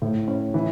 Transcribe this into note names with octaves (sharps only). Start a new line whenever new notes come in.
A2
C#4
E3